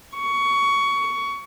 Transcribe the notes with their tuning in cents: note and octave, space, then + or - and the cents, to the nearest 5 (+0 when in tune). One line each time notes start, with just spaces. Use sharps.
C#6 +20